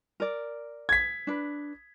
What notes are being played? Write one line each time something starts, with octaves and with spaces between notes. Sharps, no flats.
A#4 D5
G#6 B6
D4 B4